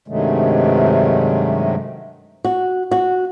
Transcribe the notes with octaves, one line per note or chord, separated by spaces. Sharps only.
G2 C3 D#3 F#3 G#3 A3
F#4
F#4